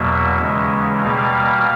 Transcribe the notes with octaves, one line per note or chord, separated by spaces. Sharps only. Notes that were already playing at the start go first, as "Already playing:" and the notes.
Already playing: E2 B2 F#3 A#3 E5
D#2 C#3 E3 G#3 C#4
B2 G3 A#3 F5